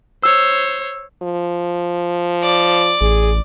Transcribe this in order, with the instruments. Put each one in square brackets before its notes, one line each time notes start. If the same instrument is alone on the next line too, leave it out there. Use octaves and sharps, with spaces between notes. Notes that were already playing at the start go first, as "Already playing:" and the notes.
[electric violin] C5 C#5 [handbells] E6
[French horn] F3
[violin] D5
[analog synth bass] A1 [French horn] G#4